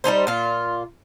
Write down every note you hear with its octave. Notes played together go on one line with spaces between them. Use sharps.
G3 G#3 D#4 C5
A#2 F4